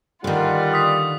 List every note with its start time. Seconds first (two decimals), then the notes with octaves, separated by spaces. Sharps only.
0.24 D3 D#3 G3 F4 F#5
0.74 D#6 B6